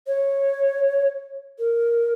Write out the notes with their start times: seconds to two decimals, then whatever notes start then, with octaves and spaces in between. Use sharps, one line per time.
0.07 C#5
1.59 A#4